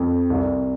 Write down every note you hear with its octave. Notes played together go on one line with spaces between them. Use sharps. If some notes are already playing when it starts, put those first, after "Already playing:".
Already playing: F2
C2